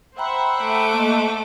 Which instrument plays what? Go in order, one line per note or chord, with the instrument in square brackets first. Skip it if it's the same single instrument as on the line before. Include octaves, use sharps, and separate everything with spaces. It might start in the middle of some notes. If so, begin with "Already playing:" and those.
[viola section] C5 E5 F#5 [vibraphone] G5 A#5 B5
[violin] A3 D6
[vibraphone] A#3 D#5